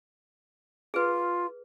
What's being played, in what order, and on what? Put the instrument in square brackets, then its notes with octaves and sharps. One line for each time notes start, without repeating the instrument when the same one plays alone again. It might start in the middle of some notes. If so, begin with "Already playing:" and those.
[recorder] F4 [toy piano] G#4 B4